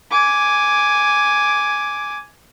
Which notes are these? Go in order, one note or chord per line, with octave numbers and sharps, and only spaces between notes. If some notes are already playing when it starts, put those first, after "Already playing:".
G#5 D6